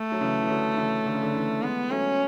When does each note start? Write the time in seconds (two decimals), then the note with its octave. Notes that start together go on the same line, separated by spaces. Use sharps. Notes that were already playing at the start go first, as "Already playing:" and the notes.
Already playing: A3
0.12 F#3
0.21 C#3 E3
0.43 E3
0.49 D3 F#3
0.77 C#3 E3
1.06 D3
1.14 C#3
1.23 D3
1.34 C#3 E3
1.62 E3 G#3 B3
1.90 F#3 A3 C#4